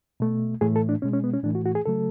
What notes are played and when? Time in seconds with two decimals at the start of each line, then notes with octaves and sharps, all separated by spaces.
0.20 B2 A3
0.61 A2 E3 A3 G#4
0.76 A4
0.89 D4
1.02 B2 G#3 C#4
1.14 C#4
1.24 B3
1.34 C#4
1.44 A2 E3 A3 D4
1.55 F#4
1.66 F#4
1.75 G#4
1.86 C#3 F#3 A3 A4